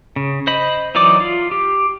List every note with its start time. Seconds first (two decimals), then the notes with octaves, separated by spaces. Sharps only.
0.16 C#3
0.47 C5 D#5 B5
0.95 E3 F#3 D#4 D5 D6
1.20 F4
1.51 G4